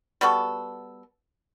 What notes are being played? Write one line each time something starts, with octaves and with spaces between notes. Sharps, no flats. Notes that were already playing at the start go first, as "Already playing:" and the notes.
G3 B3 F#4 A4